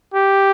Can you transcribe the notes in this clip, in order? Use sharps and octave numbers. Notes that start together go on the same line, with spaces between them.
G4